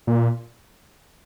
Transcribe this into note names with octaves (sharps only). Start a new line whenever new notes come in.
A#2